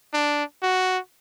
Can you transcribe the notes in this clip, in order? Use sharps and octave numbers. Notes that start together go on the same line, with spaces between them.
D4
F#4